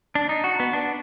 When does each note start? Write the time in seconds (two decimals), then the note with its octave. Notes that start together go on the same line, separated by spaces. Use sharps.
0.15 D4
0.29 D#4
0.44 F#4
0.60 B3
0.73 D4